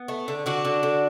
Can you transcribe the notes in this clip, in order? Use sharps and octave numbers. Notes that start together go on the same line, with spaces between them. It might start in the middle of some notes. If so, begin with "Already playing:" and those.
Already playing: B3
A3
D3
D3 D4 F#4
D3
D3